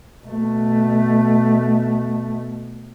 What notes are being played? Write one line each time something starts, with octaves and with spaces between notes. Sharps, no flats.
B2 A3